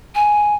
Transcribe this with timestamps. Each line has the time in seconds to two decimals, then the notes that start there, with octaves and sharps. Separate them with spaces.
0.15 G#5